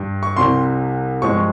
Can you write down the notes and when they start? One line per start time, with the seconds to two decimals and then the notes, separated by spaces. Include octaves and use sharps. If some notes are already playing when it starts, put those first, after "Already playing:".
Already playing: G2 G3
0.23 C#6
0.36 C2 C3 G3 C6
1.22 G2 F3 G#3 C#6